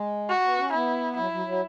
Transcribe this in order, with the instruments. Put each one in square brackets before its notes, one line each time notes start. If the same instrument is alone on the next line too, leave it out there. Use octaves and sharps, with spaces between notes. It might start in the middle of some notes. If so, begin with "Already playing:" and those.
Already playing: [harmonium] G#3
[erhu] F#4
[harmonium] B3
C#4
[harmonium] B3 [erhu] E4
[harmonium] F#3 [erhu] E4
[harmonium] F#3
F#3